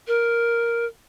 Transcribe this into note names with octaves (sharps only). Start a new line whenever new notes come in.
A#4